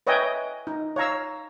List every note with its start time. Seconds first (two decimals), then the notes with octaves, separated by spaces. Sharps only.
0.07 B4 C#5 D#5 E5 G5 G#5
0.67 D#4
0.96 C#5 F5 A#5 E6